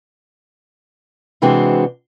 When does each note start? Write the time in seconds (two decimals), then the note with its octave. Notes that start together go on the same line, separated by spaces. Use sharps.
1.42 C3 E3 G#3 C4 D4 F#4